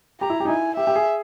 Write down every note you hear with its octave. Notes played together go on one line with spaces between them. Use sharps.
G4 A#5
E4
G4
D#4
E4 G#5
G4 E5
G4
G#4